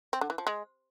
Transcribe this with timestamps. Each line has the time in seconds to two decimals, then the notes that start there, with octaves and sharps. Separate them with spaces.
0.13 C4
0.21 D3
0.30 E3
0.38 F3
0.47 G#3